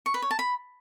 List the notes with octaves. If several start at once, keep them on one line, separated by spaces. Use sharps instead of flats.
C#6
B4
C#5
A5
B5